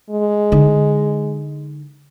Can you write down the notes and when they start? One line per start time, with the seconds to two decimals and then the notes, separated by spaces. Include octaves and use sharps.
0.10 G#3
0.52 D3 D#4